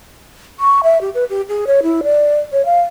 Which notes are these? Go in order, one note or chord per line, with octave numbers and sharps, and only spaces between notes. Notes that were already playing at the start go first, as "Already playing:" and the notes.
C#6
E5
G4
B4
G4
G#4
C#5
E4
D5
C#5
F5